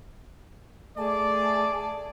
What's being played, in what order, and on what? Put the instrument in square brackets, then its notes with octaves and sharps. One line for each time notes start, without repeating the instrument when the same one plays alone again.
[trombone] A3 [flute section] G#4 G#5 A5 [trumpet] D5